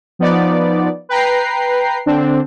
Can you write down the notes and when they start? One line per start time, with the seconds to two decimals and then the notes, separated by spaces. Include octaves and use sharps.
0.19 F3 B3 D#4 D5
1.09 B4 G5 A#5 C7
2.06 D3 C4 D4